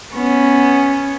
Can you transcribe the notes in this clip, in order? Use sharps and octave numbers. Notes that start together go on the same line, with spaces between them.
B3 C#4